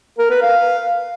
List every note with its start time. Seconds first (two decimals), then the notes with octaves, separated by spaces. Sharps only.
0.18 A#4
0.30 B4
0.42 F5